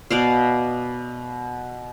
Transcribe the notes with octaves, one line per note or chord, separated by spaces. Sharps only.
B2 D5 F5